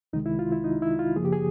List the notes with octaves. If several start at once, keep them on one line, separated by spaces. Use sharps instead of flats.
C2 C3 D#3 G#3 D#4
E4
F4
E4
D#4
E4
F4
F#2 C#3 F3 A#3 G#4
G4
G#4